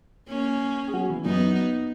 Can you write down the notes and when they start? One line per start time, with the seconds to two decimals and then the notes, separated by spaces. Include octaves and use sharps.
0.29 A#3 C#4
0.88 G#4
0.93 F#3 F#4
1.09 E3 E4
1.25 F#2 F#3 B3 D#4